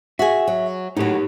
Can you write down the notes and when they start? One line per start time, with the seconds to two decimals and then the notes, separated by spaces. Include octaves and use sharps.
0.19 F#4 G#4 E5
0.47 F#3
0.97 A2 F#3 D#4 G4